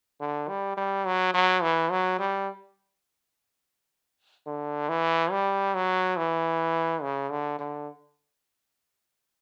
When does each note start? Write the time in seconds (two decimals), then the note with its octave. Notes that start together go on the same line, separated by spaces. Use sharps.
0.21 D3
0.49 G3
0.77 G3
1.06 F#3
1.34 F#3
1.63 E3
1.91 F#3
2.19 G3
4.46 D3
4.89 E3
5.31 G3
5.74 F#3
6.17 E3
7.02 C#3
7.31 D3
7.59 D3